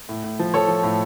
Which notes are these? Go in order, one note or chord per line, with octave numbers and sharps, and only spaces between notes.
A2
A2
F3
F3 A4 C#5
F3
A2